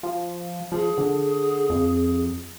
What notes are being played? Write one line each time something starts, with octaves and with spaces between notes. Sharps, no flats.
F3
F3 G#4
D3
F2